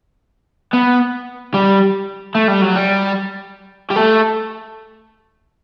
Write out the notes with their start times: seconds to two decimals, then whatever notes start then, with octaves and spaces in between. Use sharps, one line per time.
0.74 B3
1.54 G3
2.35 A3
2.48 G3
2.62 F#3
2.76 G3
3.90 G3
3.96 A3